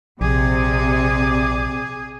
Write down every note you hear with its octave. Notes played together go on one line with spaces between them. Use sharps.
A#1 C3 G#4 D5